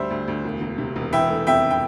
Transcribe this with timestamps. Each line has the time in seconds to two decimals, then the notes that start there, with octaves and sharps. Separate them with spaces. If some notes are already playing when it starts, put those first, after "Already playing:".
Already playing: D2 G3 C5 E5
0.10 D2
0.28 D2
0.45 E1
0.61 E1
0.78 C3
0.96 E1
1.13 E3 E5 G5
1.30 A3
1.47 F2 E5 G5
1.71 G5